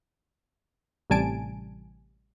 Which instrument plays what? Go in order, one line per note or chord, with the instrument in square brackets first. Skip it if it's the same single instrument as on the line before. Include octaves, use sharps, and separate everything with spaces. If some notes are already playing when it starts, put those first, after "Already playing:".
[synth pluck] A1 C3 G3 G#5 A5 D7